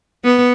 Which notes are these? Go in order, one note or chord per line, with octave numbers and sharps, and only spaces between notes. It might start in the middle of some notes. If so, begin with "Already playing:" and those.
B3